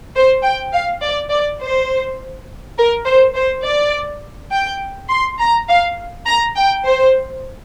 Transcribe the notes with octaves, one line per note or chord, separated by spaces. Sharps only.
C5
G5
F5
D5
D5
C5
A#4
C5
C5
D5
G5
C6
A#5
F5
A#5
G5
C5